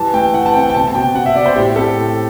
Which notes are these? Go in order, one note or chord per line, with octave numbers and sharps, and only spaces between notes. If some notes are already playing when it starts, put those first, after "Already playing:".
Already playing: E3 G3 A5
A3 G5
E3 F#5
A5
C4 G5
G5
B2 A5
A5
B2 G5
B2 F#5
E5
B2 D5
C5
A2 G4
C4 A4
A2